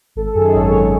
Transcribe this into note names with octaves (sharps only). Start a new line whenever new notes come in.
G#1 A4
A4
F#2 D#3 G#4
A4
G#1 C#5
F#2 D#3